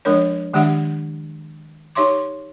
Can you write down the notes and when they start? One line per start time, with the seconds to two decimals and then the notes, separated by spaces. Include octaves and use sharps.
0.05 F3 G#3 D4 A#4 C#5
0.54 D#3 G#3 D4 G4 E5 F#5
1.95 D#4 G4 C#5 E5 C6 D6